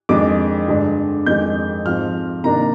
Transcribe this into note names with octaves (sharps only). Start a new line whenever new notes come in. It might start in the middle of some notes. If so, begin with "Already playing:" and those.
F2 D#3 G#3 D4 D6
G2 D3 G#3 D4
F2 D#3 G#3 G6
G#2 F3 C4 F6
C3 D#3 A#3 D4 A#5